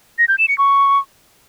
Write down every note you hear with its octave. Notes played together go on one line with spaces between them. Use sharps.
A#6
G6
E7
C#7
C#6